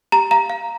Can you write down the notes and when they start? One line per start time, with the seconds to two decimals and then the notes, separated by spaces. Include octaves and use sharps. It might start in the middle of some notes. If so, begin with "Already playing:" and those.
0.12 G4 A#5
0.31 F5 A#5
0.50 F5